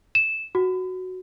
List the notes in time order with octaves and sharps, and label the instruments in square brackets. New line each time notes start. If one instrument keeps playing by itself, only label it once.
[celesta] E7
F#4